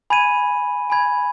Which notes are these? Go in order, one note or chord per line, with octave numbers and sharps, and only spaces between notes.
G#5 B5 G#6 D#7
G#5 B5 G#6